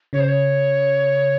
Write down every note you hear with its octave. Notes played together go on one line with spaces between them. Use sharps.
C#3 C#5
C5
C#5